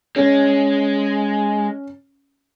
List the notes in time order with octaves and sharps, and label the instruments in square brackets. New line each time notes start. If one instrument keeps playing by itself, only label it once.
[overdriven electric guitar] G#3 [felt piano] C#4